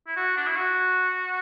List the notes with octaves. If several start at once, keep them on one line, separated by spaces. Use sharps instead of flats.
E4
F#4
D4
E4
F#4